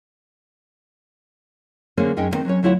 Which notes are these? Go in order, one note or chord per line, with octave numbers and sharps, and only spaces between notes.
D3 G#3 A#3 C4 C#4
F#2 G#3 C#4 D#4 D#5 G5
D3 D#3 B3 C4 D#4
F#3 G#3 C#4 C#5
D2 F#3 E4 F4 C#5 F#5